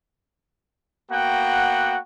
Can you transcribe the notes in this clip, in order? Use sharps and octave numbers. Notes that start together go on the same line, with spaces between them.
A#3 B3 F#4 F#5 G5